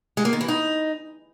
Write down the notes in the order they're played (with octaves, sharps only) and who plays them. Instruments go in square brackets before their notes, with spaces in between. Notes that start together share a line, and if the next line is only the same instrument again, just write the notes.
[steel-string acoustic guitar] G#3
A#3
D#3
E3
D#4